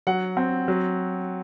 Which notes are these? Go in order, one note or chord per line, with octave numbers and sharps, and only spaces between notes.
F#3 F#5
C4
F#3